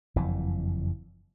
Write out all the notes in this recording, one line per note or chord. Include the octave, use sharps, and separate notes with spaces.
F#1 F2 E3